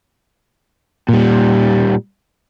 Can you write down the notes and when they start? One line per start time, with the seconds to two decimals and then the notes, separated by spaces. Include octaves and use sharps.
1.09 A#2 G3